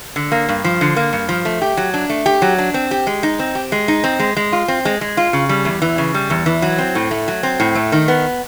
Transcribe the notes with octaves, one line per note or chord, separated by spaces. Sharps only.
D3
A#3
G2
F3
D3
A#3
G2
F3
A3
G4
F#3
D4
A3
G4
F#3
D4
C4
G4
G#3
D#4
C4
G4
G#3
D#4
C4
G#3
G#3
F4
C4
G#3
G#3
F4
C#3
G3
E2
E3
C#3
G3
E2
E3
F#3
C4
A2
A3
F#3
C4
A2
A3
D#3
B3